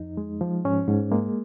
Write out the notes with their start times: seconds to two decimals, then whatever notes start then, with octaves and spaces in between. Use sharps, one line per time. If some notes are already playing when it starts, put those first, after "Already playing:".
Already playing: F2 D#4
0.17 G#3
0.41 F3
0.65 G#2 C#4
0.88 G#2
1.12 G#3 A#3